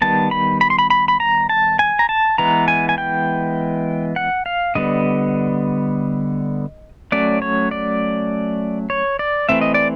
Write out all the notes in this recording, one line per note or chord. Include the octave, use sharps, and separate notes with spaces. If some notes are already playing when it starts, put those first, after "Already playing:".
D#3 G3 B3 A5
B5
B5
C6
B5
B5
B5
A#5
A5
G#5
A#5
A5
E3 G#3 B3 A#5
G#5
G#5
G5
F#5
F5
D3 G3 B3 D#5
F#3 A3 C#4 D5
C#5
D5
C#5
D5
E3 A3 C4 E5
D#5
D5